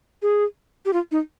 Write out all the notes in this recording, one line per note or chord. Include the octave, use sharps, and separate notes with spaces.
G#4
G4
F4
D#4